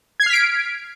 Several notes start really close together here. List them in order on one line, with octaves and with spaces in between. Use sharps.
G#6 C7 F6 B6 D7